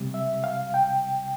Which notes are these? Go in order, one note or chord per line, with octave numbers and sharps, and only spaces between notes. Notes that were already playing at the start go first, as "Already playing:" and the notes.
Already playing: C3 G3
E5
F5
G5